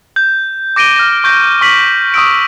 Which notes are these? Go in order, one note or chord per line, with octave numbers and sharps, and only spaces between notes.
G6
D6 A#6 D7 D#7 G7
F6 A#6
C#6 G6 A#6
C#6 D6 B6 F#7
C#6 D#6 E6 D7